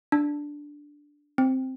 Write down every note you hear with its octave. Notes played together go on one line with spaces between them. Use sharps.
D4
C4